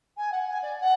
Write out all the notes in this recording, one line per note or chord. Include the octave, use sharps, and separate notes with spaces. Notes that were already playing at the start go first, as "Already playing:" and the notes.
G#5
F#5
G#5
D5
F#5